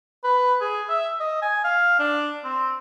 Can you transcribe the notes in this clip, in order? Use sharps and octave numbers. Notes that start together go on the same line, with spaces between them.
B4
G#4
E5
D#5
G#5
F5
D4
C4